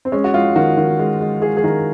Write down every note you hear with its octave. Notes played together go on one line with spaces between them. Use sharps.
C4
G#3 C#4
F#4
G#3 F4
D#3 F#4
D#3
G#3
G#3
G#3 G#4
G#4
D#3 A#4